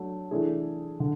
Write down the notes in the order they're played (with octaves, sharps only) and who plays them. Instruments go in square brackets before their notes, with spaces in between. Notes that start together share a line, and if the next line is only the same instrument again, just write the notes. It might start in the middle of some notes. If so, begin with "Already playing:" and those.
Already playing: [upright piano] F#3 A3 D4
E3 A3 D4 G#4
D3